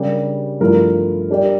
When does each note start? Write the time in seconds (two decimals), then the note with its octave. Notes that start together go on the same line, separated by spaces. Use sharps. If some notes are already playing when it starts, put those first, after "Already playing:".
Already playing: C#3 G3 D4 G4 A#4
0.60 G2 F3 A3 E4 A#4
1.30 G3 D4 G4 A#4 D5